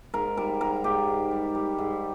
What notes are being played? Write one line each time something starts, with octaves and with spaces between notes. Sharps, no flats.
G#2 A#4
G3 A#4
G#2 A#4
G#2 G4
G#2
G3
G3
G#2